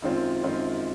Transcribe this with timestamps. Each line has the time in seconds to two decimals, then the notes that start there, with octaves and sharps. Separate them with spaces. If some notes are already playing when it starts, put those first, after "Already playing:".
0.02 F#2 D#3 G#3 C4 F4
0.43 F#2 D#3 G#3 C4 F4